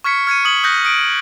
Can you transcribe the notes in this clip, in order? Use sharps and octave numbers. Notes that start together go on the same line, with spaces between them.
C#6 F6 G#6 B6 C#7
F6 G#6 C#7 D#7
D#6 G#6 C#7 F#7
D#6 F#6 G6 A#6
D#6 D7